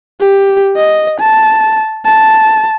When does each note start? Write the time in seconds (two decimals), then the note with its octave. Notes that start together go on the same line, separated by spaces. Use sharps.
0.20 G4
0.76 D#5
1.20 A5
2.05 A5